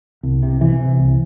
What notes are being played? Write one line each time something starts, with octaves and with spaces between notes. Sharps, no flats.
C2
C3
C3 E3
C3
C2